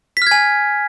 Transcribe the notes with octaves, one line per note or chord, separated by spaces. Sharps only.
G#5 F6 G#6 B6